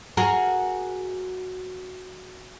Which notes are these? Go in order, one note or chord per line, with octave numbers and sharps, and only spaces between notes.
F#4 G#4 A#4